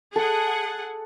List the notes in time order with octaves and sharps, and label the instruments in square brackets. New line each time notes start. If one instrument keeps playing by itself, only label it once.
[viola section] G#4 F#5 [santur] A4